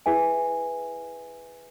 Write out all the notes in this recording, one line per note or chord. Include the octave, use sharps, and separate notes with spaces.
E4 G#4 B4 E5 G#5